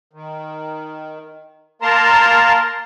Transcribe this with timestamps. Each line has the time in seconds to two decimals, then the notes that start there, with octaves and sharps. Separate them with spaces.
0.13 D#3
1.82 A#3 A#4 A5 A#5 C6